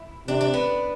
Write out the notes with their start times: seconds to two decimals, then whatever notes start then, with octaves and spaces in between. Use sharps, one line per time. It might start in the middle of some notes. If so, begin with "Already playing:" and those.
Already playing: E4
0.28 C3 D4
0.41 D4
0.54 B3